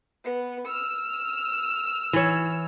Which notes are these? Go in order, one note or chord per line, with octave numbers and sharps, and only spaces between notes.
B3
E6 F6
E3 C#5